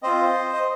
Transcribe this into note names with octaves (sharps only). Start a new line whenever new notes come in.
C4 F4 C5 D#5
D#5